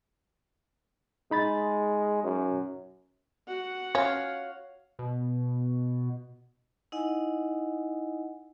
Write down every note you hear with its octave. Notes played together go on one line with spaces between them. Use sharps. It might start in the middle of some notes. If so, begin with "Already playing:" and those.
G#3 D#4 B5 A6
F#2
F#4 F#5
C#4 C#5 F5
B2
D#4 E4 D#5 F#5 G#5